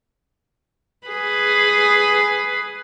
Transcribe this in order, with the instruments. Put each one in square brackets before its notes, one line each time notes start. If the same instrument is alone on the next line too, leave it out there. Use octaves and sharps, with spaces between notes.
[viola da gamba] G#4 B4